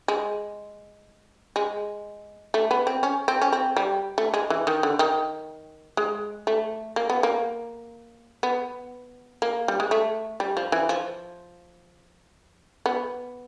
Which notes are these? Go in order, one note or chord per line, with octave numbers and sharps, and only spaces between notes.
G#3
G#3
A3
B3
C4
C#4
C4
C#4
C4
G3
A3
G#3
E3
D#3
D3
D#3
G#3
A3
A#3
B3
A#3
B3
A#3
G3
G#3
A3
G3
F3
E3
F3
B3